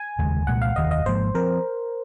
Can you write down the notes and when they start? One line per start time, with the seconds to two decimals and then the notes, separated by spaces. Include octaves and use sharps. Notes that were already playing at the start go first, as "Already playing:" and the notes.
Already playing: G#5
0.19 F1 D#2 C#3 G#3
0.47 C2 A#2 G#3 F#5
0.62 F5
0.76 F1 D#2 D#3 D#5
0.91 D#5
1.06 G#1 G#2 F3 A#3 C5
1.35 F3 C4 A#4